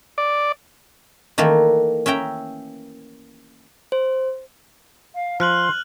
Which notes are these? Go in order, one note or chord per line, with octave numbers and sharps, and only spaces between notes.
D5
D#3 E3 A3 A#3
C#4 E5 G5 A#5
C5
F5
F3 C6 F6 F#6 F#7